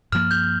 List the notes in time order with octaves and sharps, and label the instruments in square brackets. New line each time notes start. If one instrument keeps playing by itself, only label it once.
[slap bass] G2 F3 A#3 [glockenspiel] F6
[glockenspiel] G6